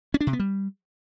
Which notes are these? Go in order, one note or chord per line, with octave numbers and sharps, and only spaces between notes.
C#4
D4
C3
B3
G3